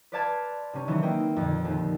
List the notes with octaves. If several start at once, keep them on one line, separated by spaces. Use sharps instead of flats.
B4 C5 D5 F5 A5 G#6
C3 C#4
D#3 E3 F#3 B3 C4
A#3 E4 D#5 G5
F2 A#2 D3
D#2 F3